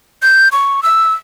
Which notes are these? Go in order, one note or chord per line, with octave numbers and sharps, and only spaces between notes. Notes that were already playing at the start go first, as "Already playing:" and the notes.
G6
C#6
E6